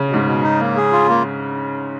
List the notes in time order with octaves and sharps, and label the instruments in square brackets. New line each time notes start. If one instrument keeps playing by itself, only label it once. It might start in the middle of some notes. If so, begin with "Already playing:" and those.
Already playing: [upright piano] C#3
[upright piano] G#2 [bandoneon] B2
[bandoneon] B2
D#4
A#3
G#4
F4
A#3